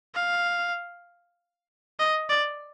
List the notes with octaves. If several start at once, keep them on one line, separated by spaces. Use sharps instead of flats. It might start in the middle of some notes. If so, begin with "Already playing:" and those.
F5
D#5
D5